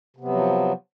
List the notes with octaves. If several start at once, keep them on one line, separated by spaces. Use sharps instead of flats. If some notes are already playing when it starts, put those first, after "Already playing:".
C3 F3 F#3 B3